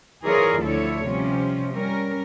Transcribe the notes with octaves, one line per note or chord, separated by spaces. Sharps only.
E3 F4 G#4 A#4 C#5 D5
D2 D3 F3 E4 A4 C#5
C3 F3 G3 C#4
G3 C#4 A#4